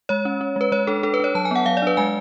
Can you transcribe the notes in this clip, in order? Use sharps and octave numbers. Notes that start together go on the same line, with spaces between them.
G#3 C#5
C#4
C#4
G#3 B4
G#3 C#5
D4 A4
D4 A4
B4
D4 C#5
F#3 A5
G#5
B3 F#5
F#3 F5
D5
D4 B4
G#3 G#5